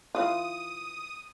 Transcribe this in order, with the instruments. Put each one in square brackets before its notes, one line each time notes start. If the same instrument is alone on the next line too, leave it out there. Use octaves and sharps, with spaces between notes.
[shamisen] E3 F4 [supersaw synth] D#6